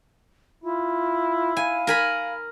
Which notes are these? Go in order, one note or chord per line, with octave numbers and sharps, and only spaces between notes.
E4 F4
F5 G#5
A#4 G#5 B5